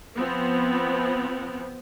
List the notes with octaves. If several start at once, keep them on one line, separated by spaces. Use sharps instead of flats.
F3 B3 C4